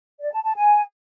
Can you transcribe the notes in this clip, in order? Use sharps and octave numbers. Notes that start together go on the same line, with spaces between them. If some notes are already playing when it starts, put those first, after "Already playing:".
D5
A5
A5
G#5